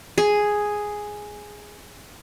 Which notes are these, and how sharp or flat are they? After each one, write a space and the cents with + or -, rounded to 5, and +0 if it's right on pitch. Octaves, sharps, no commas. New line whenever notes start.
G#4 +0